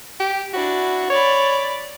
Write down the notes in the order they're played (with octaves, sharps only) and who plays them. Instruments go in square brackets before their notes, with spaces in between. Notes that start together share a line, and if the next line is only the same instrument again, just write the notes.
[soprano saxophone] G4
[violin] D4 E4 [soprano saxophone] F#4
[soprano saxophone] C#5 [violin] D5 B5